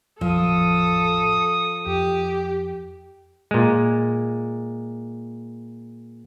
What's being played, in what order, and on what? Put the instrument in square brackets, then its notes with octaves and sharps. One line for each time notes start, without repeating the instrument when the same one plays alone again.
[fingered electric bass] A1 F2 [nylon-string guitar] F3 [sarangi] A4 [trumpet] D#6
[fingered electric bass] F2 [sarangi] G4
[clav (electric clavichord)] A#2 G#3